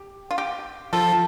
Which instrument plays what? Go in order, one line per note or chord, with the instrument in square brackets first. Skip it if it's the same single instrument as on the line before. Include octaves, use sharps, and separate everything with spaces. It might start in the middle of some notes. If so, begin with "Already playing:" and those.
Already playing: [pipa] G4
F4
G4
[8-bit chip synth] F3 F4 [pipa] A4